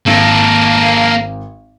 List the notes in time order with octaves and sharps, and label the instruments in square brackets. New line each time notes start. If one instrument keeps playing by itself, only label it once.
[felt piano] G#1 [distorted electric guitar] A#3 A4